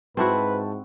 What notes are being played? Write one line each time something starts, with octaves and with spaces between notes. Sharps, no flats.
G#2 C4 E4 F#4 B4 G5 A5 C#6